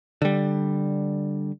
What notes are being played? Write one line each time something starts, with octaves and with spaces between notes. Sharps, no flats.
D3 G3